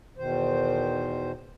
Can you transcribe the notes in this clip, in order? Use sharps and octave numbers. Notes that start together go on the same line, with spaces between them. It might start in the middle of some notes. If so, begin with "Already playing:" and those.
E2 B2 D#3 C5